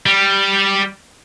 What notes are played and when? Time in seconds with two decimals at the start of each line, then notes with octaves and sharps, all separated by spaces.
0.06 G3